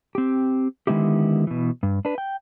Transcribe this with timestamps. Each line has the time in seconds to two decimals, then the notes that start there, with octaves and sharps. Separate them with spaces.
0.15 C4 G4
0.87 D3 D#3 G#3 B3 E4 G4
1.47 B2 E3
1.83 G2
2.05 D4 B4
2.18 G5